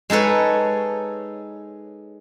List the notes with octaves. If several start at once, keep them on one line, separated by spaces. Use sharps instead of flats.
G#3 D#4 A4 B4 C#5